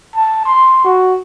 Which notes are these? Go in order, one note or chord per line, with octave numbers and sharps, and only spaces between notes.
A5
C6
F#4